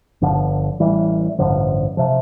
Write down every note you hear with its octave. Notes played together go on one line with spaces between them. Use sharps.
G1 G2 D3 F3
A1 A2 E3 G3
A1 G2 D3 F3
C3 F3